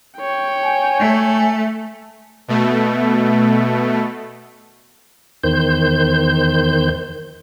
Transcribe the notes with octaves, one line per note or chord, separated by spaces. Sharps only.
C#5 G5
G#5
A3
B2 A3
E2 D#3 C5 G6